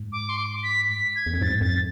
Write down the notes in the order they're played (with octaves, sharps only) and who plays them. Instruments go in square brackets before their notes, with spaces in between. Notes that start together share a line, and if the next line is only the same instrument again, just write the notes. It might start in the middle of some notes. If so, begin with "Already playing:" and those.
Already playing: [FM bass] G#2
[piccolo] D6
C6
D6
B6
B6
G#6
[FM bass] E2
F2
[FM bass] G#2 [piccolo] A6
[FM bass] F2 [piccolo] A6